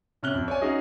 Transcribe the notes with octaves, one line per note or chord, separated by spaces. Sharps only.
C3 C#4 F6 F#6 G7
F2
C#5 D5 G#5
C#4 D#4 F#4 G#4 D#5